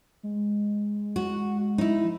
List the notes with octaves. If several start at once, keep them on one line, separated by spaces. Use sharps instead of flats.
G#3
F#4
D#4 E4
F3